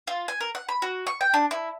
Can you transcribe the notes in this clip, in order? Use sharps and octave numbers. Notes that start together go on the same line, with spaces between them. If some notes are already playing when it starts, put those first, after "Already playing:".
F4
G#5
A#4
F#5
B5
F#4
C#6
G5
D4
E4